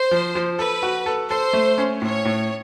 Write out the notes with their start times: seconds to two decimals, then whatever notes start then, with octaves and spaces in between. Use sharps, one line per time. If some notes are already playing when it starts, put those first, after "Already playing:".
Already playing: C5
0.11 F3
0.35 F3
0.59 A4 B4
0.83 F#4
1.06 A4
1.30 A4 C5
1.53 A3
1.78 C#4
2.02 A2 C#5
2.25 A2